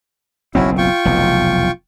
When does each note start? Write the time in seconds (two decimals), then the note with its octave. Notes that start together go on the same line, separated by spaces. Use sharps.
0.55 F#1 B1 C4 C#4 E4 F#4
0.78 F4 G5 C#6
1.05 F1 B1 E2